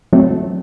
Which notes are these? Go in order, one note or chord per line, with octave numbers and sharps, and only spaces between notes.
F#3 A3 C4